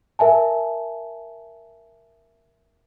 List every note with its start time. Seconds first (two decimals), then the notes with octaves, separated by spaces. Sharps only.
0.19 A#4 E5 G#5 A5